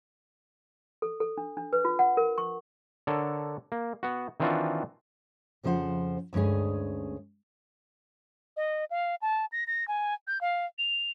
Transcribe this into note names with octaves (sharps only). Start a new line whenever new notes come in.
A4
A4
D4
D4
B4
F4
F#5
A#4
C#6
D3 A4 A#4 C#5
A#3
B3 F#4
D#3 E3 C4 D4 F4 F#4
F2 C#3 F3 A4 C5 F#5
D2 G2 G#3 C#4 G#4
D#5
F5
A5
A#6
A#6
G#5
G6
F5
F7